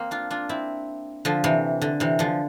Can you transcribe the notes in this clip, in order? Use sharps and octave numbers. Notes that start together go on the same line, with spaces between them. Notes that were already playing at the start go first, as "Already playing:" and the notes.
Already playing: A#3 C4
D4 F4
D4 F4
C4 E4
D3 F3
C3 E3
D3
C3 E3
D3 F3